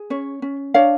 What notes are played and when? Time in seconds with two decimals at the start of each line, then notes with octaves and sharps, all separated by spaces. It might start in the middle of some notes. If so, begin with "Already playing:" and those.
Already playing: G#4
0.10 C#4 C#5
0.42 C#4
0.74 D4 C#5 F5